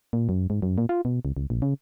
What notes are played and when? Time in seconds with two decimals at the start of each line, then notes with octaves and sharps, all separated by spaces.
0.13 A#2
0.29 F#2
0.50 G#2
0.62 F#2
0.78 A#2
0.89 F4
1.05 B2
1.25 C#2
1.37 C#2
1.50 A#1
1.62 C#3